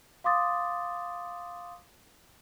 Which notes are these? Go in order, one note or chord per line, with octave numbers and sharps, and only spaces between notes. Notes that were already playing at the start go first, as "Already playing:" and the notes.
F5 C6 D6 D#6 A6